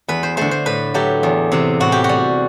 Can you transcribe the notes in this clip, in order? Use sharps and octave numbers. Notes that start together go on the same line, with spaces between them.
E2 B4
C5
D3 A3 C5
C5
A2 B4
F#3 A3 G4
E2
C3 E3
A2 F#4
G4
F#4
G3